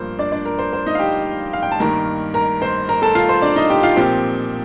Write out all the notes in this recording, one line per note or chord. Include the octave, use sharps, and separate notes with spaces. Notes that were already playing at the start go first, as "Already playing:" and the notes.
Already playing: G2 F3 A#3 C5
D4 D5
D4 D5
A#4
C5
C5
D#4 D#5
F5
G4 G5
F5
G5
A5
G2 D#3 A#3 A#4 A#5
A#4 A#5
C5 C6
A#4 A#5
A4 A5
F4 F5
C5
D4 D5
D#4 D#5
G4 G5
F4 F5
A#2 F3 C4 G4 G5